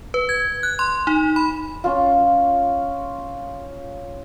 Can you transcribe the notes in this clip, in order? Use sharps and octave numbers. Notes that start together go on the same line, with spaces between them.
B4
G#6
F#6
C6
D#4
B5
C#4 F4